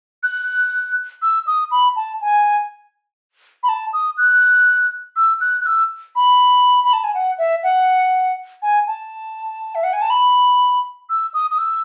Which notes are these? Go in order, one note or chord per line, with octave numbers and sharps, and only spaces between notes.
F#6
E6
D#6
B5
A5
G#5
B5
A5
D#6
F#6
E6
F#6
F#6
E6
B5
B5
A5
G#5
F#5
E5
F#5
G#5
A5
E5
F#5
G#5
A5
B5
E6
D#6
D#6
E6